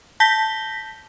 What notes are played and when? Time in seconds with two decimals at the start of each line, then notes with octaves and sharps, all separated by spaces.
0.20 A5 G6 A#6 B6 G7